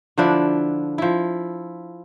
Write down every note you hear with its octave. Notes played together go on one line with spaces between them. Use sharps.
D3 F3 D4 E4
F3 E4